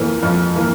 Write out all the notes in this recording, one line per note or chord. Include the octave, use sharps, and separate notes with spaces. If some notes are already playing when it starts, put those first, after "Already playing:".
Already playing: F2 E3 A#3
F2
E3 A#3